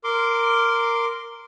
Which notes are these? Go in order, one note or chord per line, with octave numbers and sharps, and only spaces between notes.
A#4 C6 D6